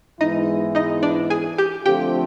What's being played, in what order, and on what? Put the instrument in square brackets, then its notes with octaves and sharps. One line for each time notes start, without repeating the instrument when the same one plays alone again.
[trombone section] G#2 E3 G#3 B3 E4 [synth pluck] D#4 D#5
[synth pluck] D#4 D#5
D4 D5
G#4 G#5
G4 G5
[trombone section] D3 F3 A3 C4 F4 [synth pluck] G4 G5